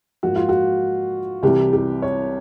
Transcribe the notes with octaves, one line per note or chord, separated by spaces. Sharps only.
G#2 F3 A#3 F#4
F4
F#4
C2 C3 E3 G3 G4
G4
C#5